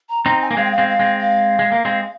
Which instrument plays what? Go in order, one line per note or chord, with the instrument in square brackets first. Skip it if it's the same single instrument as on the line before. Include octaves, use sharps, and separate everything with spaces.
[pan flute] A#5
[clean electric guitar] C4 D#4 [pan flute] A#5
[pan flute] G#5
[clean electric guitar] A#3
[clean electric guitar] G#3 C4 [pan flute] F5
[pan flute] G5
F5
[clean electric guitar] G#3 C4
[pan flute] F5
[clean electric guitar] G#3 C4
[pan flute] F5
[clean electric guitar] G#3
A#3
G#3 C4